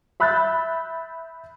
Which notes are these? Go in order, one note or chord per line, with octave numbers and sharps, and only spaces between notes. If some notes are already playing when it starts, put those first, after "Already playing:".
E5 B5 E6 F#6 G6 A6